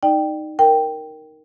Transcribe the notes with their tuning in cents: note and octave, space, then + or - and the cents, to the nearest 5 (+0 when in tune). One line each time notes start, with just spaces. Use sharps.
D#4 +0 D5 +30 G5 +0
A#4 +0 G5 +0